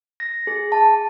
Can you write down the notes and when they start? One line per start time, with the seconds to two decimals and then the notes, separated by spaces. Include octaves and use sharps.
0.20 A#6
0.47 G#4
0.72 A5